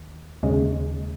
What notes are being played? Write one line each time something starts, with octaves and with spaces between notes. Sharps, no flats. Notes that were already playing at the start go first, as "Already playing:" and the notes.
Already playing: D#2
D#2 C#3 G#3